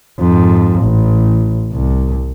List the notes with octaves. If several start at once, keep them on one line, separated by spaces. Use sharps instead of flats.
F2 G#2
A1
C2